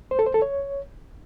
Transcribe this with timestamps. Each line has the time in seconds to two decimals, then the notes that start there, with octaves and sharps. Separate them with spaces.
0.11 C5
0.19 A4
0.27 C5
0.34 A4
0.42 C#5